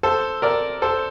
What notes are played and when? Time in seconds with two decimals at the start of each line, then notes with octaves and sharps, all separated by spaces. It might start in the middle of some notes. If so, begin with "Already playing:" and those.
0.03 A4 C5
0.42 A#4 D5
0.82 A4 C5